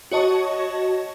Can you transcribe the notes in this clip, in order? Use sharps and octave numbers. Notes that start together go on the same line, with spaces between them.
F#4 C#5 D#5 A5 C#6